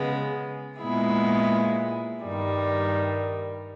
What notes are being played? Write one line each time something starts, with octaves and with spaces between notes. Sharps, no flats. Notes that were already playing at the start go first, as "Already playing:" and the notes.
Already playing: C#3 G#3 B3
A#2 G#3 B3 E4 G#4
G2 D#3 G3